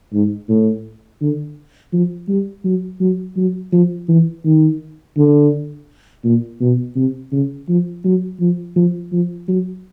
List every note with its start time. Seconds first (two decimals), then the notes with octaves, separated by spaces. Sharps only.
0.13 G#2
0.49 A2
1.21 D3
1.93 F3
2.28 G3
2.64 F#3
3.00 F#3
3.36 F#3
3.72 F3
4.08 E3
4.45 D#3
5.17 D3
6.24 A#2
6.60 B2
6.96 C3
7.32 C#3
7.68 F3
8.04 F#3
8.40 F3
8.76 F3
9.12 F3
9.48 F#3